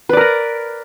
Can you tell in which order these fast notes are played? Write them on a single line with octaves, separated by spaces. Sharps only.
B4 D5 A#4 A#5